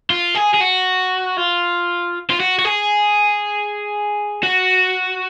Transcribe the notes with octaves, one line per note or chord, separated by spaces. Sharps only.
F4
G#4
G#4
F#4
F4
F4
F#4
F#4
G#4
F#4